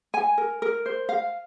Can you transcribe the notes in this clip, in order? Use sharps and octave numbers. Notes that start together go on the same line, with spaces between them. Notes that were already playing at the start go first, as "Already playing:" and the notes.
G#5
A#4
A#4
C5
F5